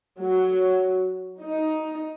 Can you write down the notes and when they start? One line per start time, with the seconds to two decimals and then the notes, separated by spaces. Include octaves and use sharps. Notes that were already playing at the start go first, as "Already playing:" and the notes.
0.19 F#3
1.42 D#4